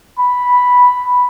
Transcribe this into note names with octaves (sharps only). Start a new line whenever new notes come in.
B5